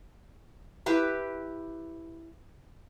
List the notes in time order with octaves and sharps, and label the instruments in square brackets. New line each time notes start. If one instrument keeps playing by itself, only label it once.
[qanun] E4 G4 B4